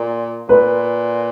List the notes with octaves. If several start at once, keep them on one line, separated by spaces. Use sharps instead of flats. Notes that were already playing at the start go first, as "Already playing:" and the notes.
Already playing: A#2
A#2 B4